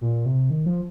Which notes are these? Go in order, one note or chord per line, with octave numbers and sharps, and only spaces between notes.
A#2
C3
D#3
F3